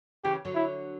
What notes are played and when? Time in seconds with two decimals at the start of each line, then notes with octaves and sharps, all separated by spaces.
0.24 C#3 E3 G4
0.45 D3 F#3
0.55 E4